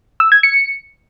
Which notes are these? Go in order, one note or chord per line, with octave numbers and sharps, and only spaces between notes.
E6
G#6
C#7